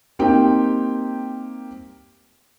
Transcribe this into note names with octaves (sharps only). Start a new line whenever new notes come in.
A#3 C4 D#4 G4 G5